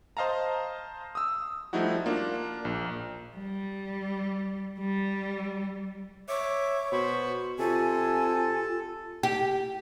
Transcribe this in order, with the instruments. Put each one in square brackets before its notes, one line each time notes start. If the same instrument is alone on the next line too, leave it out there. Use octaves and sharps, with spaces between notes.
[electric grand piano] C5 D#5 F5 A5 A#5
D#6 E6
F3 G3 A3 D#4 E4 F#4
A#3 D4 F4
A#1
[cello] G3
G3
[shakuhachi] C#5 [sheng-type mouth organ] E5 D6
[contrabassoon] B2 [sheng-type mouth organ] C5 B5 C#6
[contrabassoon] C3 [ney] F4 [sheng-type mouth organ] A4 [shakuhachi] G#5
[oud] G4